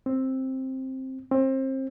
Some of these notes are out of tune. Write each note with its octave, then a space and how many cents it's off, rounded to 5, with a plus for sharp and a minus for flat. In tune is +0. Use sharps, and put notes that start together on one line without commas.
C4 +10
C4 +30